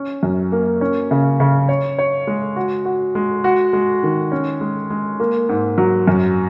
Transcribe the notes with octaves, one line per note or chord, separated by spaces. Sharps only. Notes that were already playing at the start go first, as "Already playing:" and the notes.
Already playing: C#4
F#2
A#3
C#4
C#3
C#3
C#5
C#5
G#3
F#4
F#4
G#3
F#4
G#3
D#3
C#4
G#3
G#3
A#3
G#2
F#3
F#2